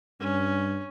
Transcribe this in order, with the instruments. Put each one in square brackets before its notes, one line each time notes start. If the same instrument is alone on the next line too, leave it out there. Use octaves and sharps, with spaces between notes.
[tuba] G2 [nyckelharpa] C#4